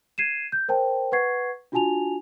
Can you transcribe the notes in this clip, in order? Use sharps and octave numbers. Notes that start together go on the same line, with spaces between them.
G#6 C7 D#7 E7
G6
A#4 C5 G5 A5
B4 F#5 C#6 G#6 C7
D4 F4 F#4 G#5 A5 F7